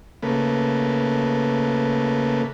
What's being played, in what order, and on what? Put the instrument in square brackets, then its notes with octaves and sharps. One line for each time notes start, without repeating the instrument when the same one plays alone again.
[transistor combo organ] C#3 A3 A#3 B4